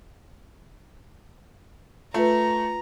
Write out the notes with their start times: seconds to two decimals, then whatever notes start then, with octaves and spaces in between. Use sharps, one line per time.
2.14 A3 F4 B4 A#5